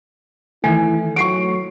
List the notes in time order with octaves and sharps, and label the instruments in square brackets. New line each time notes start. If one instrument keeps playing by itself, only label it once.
[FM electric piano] D#3 E3 A3 [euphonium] E4 [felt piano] G#5
[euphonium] F#3 [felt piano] C#6 C7 D7